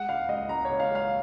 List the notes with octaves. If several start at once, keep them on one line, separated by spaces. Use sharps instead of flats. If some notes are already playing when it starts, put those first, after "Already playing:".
Already playing: G#3 F#5
C#2 F5
C#2 D#5
C#2 A#5
C#2 C#5
F5
G#3 F5